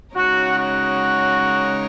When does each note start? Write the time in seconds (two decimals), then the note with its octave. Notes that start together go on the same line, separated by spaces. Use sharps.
0.15 C#3 G#3 D#4 F#4 A#4 C#5
0.57 F#4